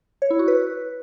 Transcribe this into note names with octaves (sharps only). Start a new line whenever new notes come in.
C#5
E4
F#4
B4